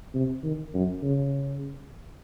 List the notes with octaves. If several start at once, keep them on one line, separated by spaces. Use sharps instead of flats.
C3
D#3
F#2
C#3